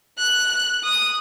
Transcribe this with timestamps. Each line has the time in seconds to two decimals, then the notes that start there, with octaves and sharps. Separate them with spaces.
0.18 F#6
0.84 D#6